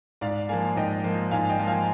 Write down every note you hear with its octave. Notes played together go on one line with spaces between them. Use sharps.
G#2 D5 F5
F3 A#3 F5 G#5
G#2 D#5 G5
F3 A#3
G#2 F5 G#5
D#5 G5
F3 A#3
F5 G#5